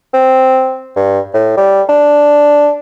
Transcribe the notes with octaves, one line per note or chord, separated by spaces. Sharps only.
C4
G2
A2
G3
D4